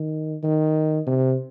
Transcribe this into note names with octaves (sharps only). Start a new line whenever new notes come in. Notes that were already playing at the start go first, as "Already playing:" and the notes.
Already playing: D#3
D#3
C3